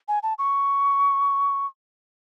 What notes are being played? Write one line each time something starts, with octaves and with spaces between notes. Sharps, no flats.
G#5
A5
C#6